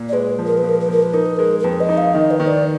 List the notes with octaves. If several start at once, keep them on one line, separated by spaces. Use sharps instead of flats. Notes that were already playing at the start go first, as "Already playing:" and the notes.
Already playing: A#2
D5
G#3 B4
F3
A#4
B4
F3
A#4
B4
F3 A#4
B4
D#4 A#4
B4
G#3 A#4
A#4
F2 B4
D#5
D#4
F5
D#3 D#5
B4
D#3
D5